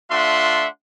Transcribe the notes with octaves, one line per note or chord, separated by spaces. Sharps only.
A3 D4 F4 E5 F#5 C6